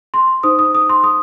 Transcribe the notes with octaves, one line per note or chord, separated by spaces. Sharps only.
C6
D#4 C5 D#6
D#6
D#6
C6
D#6